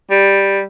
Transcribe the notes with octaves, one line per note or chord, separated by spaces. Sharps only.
G3